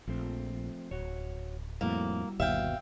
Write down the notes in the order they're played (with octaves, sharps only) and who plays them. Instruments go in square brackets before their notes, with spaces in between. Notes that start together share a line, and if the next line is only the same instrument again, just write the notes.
[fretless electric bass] A#1 [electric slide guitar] F3 A3 C4
[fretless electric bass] D1 [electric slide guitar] F#4 C#5
[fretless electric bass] F2 A2 [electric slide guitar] G3 E4 F#4 [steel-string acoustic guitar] A#3
[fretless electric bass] G1 D#2 B2 [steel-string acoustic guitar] E5 F5 G5